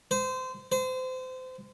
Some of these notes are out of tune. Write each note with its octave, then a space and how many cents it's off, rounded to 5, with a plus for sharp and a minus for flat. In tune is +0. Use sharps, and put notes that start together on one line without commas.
C5 -25
C5 -30